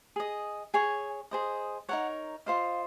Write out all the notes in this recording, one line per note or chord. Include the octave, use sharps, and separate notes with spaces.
G#4 D#5
G#4 C#5 G#5
G#4 C5 D#5
D#4 A#4 C#5 F#5
F4 C5 D#5 F5